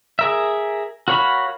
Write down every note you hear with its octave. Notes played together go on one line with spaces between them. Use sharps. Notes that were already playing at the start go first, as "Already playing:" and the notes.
G#4 A#4 E5
F#4 A#4 C#5 F5 B5